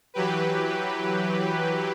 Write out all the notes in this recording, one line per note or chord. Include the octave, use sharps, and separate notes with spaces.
E3 F#3 G4 B4